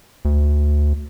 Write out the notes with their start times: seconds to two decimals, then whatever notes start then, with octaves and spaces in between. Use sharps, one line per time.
0.25 D2